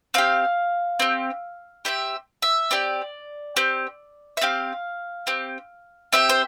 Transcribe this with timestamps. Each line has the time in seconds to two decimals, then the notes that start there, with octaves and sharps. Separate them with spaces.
0.14 C4 G4 F5
1.00 C4 G4
1.85 C4 G4 E5
2.42 E5
2.71 C4 G4 D5
3.57 C4 G4
4.37 E5
4.41 C4 G4 F5
5.27 C4 G4
6.13 C4 G4 E5
6.29 C5